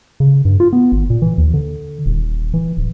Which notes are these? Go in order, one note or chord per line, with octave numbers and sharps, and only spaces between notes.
C#3
G2
F4
B3
G#1
A#2
E3
D#2
D3
D#1
E3
D1